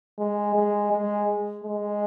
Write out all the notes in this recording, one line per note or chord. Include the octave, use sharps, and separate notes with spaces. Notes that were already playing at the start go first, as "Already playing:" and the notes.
G#3
G#3
G#3
G#3